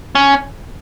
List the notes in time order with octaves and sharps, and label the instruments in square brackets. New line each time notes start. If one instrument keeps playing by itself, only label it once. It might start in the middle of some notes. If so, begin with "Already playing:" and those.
[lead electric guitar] C#4